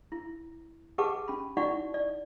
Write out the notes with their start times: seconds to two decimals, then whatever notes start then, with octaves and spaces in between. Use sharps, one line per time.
0.12 E4
0.98 G4 G#4 B4 F#5 A5 D6
1.28 C#4 B5
1.57 D#4 E4 F#4 D5 F#5 C#6
1.94 D5